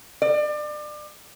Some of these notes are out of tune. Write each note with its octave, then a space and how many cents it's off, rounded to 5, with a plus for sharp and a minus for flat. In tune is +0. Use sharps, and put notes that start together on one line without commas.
D5 +30